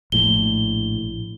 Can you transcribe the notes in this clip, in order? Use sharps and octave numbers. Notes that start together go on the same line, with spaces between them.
A#1 A2 G7